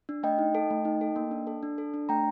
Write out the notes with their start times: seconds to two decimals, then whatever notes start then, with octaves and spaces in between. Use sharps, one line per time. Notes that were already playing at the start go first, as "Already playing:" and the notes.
0.09 D4
0.23 A3 D#5 G5
0.39 D#4
0.55 A4
0.70 A3
0.85 D#4
1.01 A4
1.16 A#3
1.31 D4
1.47 A4
1.63 D4
1.78 A4
1.94 D4
2.09 A3 G5 A#5